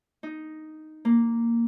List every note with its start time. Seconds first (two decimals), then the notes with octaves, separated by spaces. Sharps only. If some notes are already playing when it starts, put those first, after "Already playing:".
0.23 D#4
1.05 A#3